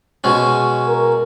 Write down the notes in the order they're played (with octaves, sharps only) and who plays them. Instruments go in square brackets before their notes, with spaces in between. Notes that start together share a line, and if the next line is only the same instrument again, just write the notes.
[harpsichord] B2 G#3 C#4
[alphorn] A#4